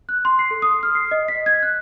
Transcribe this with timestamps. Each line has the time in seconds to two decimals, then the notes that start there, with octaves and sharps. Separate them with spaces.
0.09 F#6
0.25 C6
0.39 C7
0.51 A4
0.62 D#6
0.83 F6
0.95 C7
1.11 D#5
1.28 B6
1.46 G#6
1.63 F#6